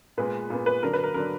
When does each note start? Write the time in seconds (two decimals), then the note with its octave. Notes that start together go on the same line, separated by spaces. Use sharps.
0.18 A#2 G#3 B3 B4
0.50 A#2 G#3 B3
0.66 B4
0.83 D3 F#3 D4 A#4
0.93 B4
1.04 A#4
1.14 D3 F#3 D4 A#4